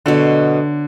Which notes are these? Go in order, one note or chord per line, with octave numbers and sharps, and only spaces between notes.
B2 D3 F#3 A3